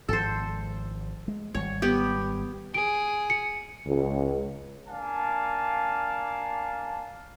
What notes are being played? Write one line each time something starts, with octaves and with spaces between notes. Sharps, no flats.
G#1 G#2 F3 A4 C5
G#3
G#1 G3 C#5
B3 G4
G#4 D7
C#7
C#2
A#3 D4 F5 G#5 A5